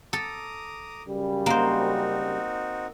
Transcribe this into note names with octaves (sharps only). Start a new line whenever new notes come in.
A4 A#5 D6 D#6
F#2 C#3 G3
A#3 C4 D#4 F#4 C5